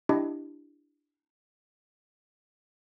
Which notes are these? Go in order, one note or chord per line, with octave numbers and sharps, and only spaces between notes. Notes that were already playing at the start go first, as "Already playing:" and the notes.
D4 E4 G4 D#5